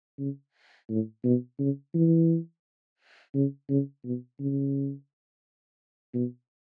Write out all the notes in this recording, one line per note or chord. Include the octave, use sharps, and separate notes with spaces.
C#3
A2
B2
C#3
E3
C#3
C#3
B2
C#3
B2